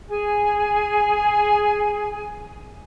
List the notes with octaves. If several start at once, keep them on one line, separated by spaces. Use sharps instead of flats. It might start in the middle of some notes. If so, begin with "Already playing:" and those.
G#4 G#5